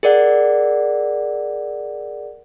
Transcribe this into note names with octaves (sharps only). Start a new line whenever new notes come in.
G#4 A#4 D5 F#5